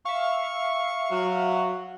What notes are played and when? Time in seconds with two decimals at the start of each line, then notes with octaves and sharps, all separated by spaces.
0.05 E5 F5 C#6
1.10 F#3 F#4